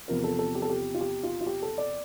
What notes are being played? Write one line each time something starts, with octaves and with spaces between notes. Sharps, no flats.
E2 C3 F3 A#4
A4
A4
G4
A4
G4
F4
G4
F4
F4
G4
A4
D5